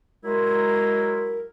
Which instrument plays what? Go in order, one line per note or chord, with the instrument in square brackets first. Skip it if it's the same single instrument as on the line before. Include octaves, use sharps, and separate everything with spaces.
[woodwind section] F#3 G#3 E4 A#4